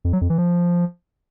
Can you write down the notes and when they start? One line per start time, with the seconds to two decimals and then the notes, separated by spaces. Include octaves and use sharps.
0.05 F2
0.13 F#3
0.21 F2
0.30 E3
0.38 F3